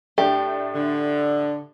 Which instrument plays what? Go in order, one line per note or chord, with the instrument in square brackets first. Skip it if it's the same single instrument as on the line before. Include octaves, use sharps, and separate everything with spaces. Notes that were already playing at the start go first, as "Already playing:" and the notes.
[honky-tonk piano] A2 A3 D4 [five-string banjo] G4
[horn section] D3